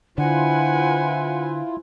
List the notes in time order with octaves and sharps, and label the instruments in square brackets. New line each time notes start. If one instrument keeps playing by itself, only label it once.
[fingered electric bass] D3 [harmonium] E4 F4 [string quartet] B4 C5 G#5 [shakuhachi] F#5